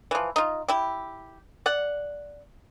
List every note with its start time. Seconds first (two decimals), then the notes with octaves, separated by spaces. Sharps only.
0.11 E3 F3
0.36 D#4 F4
0.68 E4 G4
1.66 D5 F#5